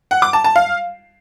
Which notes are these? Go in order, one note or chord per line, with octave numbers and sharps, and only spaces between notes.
F#5
D6
A5
A5
F5